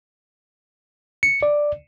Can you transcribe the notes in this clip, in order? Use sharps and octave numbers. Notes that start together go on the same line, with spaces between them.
C#7
D5